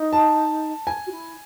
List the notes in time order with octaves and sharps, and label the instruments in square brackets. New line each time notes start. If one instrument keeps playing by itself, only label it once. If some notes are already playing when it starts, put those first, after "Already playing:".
Already playing: [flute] D#4
[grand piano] A5
G#5
[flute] F#4
E4